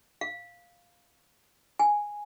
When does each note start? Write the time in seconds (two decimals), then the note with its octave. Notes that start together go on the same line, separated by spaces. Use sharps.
0.21 F5
1.79 G#5